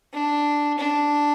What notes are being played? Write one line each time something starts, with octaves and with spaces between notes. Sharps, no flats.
D4
D4